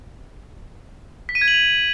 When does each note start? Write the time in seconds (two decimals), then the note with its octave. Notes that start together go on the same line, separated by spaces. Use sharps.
1.29 B6
1.35 D#7
1.41 G#6
1.48 F#7
1.54 F7